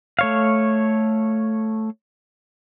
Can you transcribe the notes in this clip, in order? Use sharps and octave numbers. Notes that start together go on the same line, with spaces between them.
A3 C#5 F5